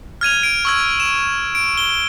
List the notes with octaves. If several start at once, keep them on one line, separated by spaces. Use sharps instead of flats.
F6 G#6 D#7 F7
D7
C#6 E6 G#6
E7
D7
G7